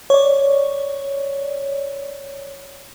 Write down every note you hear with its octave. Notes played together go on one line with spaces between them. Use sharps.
C#5 D5